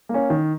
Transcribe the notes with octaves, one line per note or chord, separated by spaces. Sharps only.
A#3 C#4
D#3